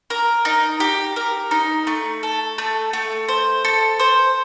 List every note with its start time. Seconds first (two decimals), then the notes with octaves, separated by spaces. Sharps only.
0.10 A#4
0.45 D#4
0.80 G4
1.16 A#4
1.51 D#4
1.87 A3
2.23 A4
2.58 A3
2.93 A3
3.28 C5
3.65 A4
3.99 C5